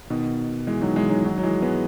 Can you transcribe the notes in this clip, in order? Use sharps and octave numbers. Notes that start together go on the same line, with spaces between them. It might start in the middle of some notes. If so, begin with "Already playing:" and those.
B2 D#3
E3 G#3
D#3 F#3
E3 G#3
D#3 F#3
D#3 F#3
F#3
E3 G#3
G#3 B3